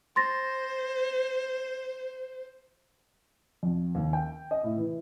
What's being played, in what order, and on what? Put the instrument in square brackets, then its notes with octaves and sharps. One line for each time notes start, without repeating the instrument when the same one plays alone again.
[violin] C5 [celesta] C6 A6 A#6
[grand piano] F2
D#2
G5
D#5
A2
E3